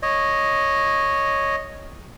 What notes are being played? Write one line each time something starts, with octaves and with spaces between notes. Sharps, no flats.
C#5 D#5